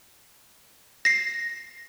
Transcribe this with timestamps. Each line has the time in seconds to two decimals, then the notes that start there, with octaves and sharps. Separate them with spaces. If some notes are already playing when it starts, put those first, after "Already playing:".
1.05 A#6 C7